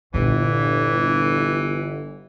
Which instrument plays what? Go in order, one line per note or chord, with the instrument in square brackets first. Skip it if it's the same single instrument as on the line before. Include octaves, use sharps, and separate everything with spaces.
[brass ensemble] G1 [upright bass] A#2 D3 [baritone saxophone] E3